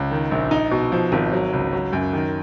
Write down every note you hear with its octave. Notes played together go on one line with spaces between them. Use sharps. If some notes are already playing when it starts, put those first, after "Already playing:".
Already playing: C#2
D#3
A#1
D#4
B2
F3
G#1
F#3
C#2
F#3
F#2
D#3